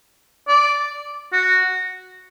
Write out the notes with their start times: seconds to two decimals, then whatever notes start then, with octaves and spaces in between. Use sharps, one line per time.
0.48 D5
1.33 F#4